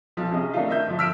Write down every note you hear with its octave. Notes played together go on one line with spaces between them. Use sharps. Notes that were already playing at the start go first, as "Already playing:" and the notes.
B1 F3
C3 C#4 G#4 D#5
D#3 A3 D4 D#4 F4
D#5 E5 G6
G1 F3
E6 F6 B6 D7 E7